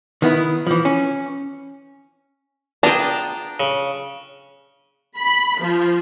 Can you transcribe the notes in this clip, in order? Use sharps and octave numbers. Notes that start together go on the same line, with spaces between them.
D#3 B3 E4
E3 F3
C#4
B3 D4 F4 G#4 G5 A#5
C#3
B5
F3